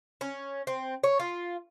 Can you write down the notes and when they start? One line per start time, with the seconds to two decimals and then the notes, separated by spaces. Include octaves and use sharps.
0.21 C#4
0.67 C4
1.04 C#5
1.20 F4